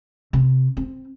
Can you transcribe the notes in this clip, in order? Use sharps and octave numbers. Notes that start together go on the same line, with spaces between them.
C3
C4